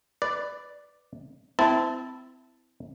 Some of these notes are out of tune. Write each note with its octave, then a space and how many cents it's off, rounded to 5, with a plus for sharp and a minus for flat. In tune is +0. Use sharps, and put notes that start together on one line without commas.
B4 +10 D5 +0
C4 -30 E4 +0 A5 +0